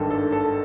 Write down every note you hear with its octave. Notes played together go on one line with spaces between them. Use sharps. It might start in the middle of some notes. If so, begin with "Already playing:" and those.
Already playing: G#1 G2 D#3 A4
A4
A4